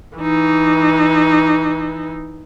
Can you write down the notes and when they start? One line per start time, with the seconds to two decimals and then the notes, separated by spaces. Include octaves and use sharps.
0.17 E3 D#4